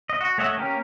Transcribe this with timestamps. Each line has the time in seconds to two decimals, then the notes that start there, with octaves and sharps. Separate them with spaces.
0.10 D#5
0.21 F#4
0.38 A3 C#5 D#5 E5 F#5
0.57 A#3 C#4 G4 A#4